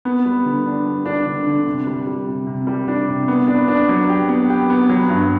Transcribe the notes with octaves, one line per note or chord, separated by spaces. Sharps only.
B3
G3
D3
D4
G3
D4
D3
D3
C3
G3
G3
C3
C3
G3
D4
C3
B3
D4
D4
F#3
G4
B3
G4
B3
F#3
G2